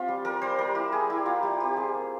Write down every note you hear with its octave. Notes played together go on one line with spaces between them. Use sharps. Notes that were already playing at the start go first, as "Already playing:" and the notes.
Already playing: C4 F4 G4
G3
G3 A#4
G3 C5
G3 A#4
E4 G4
G3 G#4
E4 G4
G3 F4
G3 G4
C4 G4
F4 G#4
A#3